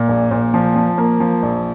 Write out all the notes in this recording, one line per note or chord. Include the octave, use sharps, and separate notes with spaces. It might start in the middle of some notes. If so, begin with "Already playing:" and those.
Already playing: A#2
A#1
A#2
F3
F3
A#3
F3
A#1